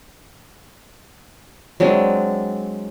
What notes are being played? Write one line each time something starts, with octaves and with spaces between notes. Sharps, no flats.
F#3 G#3 C4 D4